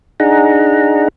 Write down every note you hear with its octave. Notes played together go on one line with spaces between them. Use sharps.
D4 D#4 G#4 F#5 A#5